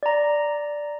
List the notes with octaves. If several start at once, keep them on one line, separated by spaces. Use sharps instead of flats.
D5 A#5